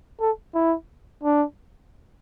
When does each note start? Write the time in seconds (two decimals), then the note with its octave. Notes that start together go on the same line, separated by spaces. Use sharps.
0.20 A4
0.54 E4
1.23 D4